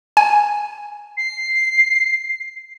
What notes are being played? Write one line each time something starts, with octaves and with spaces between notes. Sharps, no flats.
G#5
C7